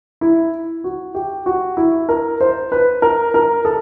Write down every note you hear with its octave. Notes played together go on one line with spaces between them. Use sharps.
E4
F#4
G4
F#4
E4
A#4
C5
B4
A#4
A#4
A4